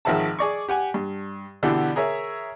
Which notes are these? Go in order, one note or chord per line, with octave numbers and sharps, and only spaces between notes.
G#1 D#3 F3 E5 F#5 A5
G#4 D5 C#6
G4 F#5 G#5
G2
B2 D3 E3 E4 F#4 G4
G#4 A#4 C#5 E5